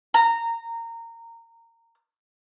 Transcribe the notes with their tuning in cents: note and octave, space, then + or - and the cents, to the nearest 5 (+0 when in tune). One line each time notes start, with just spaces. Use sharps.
A#5 -15